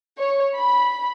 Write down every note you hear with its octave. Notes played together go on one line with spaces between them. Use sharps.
C#5
B5